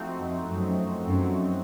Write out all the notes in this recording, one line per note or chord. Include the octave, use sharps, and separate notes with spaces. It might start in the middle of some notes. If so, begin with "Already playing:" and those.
Already playing: F3 A3 C4 D#4 F#4
F2
F#2
F#2